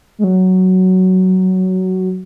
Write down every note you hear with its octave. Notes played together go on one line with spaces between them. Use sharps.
G#3
F#3